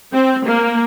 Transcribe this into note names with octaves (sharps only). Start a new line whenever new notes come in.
C4
A#3